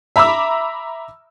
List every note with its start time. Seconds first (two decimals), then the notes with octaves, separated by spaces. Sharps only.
0.16 E5 A#5 B5 D6 E6